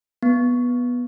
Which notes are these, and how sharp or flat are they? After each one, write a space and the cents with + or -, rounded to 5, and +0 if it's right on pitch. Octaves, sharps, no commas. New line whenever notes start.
B3 -10